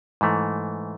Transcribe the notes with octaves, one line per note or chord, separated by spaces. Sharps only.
G#2 E3 A3